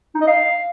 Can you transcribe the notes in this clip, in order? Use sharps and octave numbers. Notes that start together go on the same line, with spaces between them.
D#4
D#5
F5